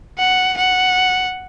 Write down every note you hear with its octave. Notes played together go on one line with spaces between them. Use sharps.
F#5
F#5